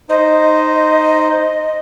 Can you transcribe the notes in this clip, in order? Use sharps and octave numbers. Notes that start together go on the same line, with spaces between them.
D#4 C5 D#5